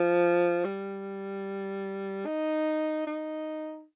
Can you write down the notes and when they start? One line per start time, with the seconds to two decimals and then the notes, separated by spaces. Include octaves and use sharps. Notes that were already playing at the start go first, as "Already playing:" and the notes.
Already playing: F3
0.65 G3
2.26 D#4
3.07 D#4